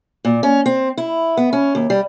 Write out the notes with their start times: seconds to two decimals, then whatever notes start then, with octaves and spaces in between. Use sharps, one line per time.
0.25 A#2
0.43 C#4
0.66 C4
0.97 E4
1.37 B3
1.53 C#4
1.75 D#2
1.90 G3